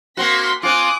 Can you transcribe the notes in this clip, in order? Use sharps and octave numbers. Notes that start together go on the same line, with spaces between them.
A#3 C4 F#4 C6 B6
C4 F4 G#5 D6 D#6 F#6